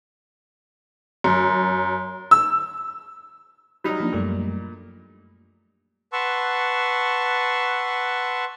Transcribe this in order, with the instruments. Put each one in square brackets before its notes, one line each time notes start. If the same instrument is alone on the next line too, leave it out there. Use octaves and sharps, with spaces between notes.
[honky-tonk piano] F#2
E6
[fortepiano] F#3 G3 D#4 [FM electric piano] B5 F6 A#6
[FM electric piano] F3 A#3 D4
[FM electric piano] F#2 G3 A3 [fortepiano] A#2
[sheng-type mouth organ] B4 F#5 A5 C6 C#6 E6